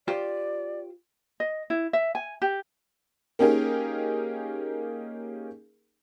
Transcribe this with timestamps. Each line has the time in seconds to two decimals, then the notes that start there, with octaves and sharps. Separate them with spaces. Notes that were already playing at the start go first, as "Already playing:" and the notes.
0.08 F4 G4 C5 D5
1.40 D#5
1.70 E4
1.93 E5
2.15 G#5
2.42 G4
3.39 A#3 C#4 D#4 G4 G#4 A#4